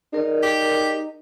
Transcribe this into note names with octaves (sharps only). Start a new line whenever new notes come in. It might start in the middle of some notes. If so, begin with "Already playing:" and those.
D#4 G#4 A#4 D5
G4